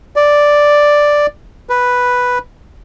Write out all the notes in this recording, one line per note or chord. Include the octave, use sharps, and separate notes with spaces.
D5
B4